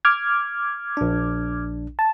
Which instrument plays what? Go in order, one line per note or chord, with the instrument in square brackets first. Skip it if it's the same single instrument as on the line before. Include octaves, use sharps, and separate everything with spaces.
[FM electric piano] D6 F6 G#6
[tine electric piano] A#1 D4
[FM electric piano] A5